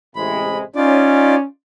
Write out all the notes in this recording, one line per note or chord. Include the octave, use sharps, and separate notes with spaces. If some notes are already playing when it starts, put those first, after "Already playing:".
A1 C3 G#3 B5
C#4 D#4 F4 D5